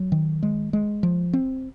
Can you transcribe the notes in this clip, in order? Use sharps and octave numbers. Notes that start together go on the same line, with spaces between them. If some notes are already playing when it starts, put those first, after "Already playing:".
Already playing: F#3
D#3
G#3
G#3
F3
C4